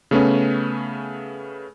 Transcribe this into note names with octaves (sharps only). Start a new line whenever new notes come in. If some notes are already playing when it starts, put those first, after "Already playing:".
C#3 A3 B3 C#4